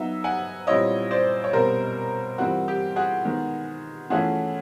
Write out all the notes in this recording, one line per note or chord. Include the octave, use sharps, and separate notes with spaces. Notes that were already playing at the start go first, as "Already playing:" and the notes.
Already playing: F#3 B3 D#4 E5
F#5 G#5
A#2 G3 C4 E4 C#5 D#5
C5 D5
C#5
B2 G3 C4 A#4 C5
E3 G3 C4 F4 F#4
G4
F#4 G#4
D#3 G#3 B3
E3 A3 C#4 F4 F#4 G#4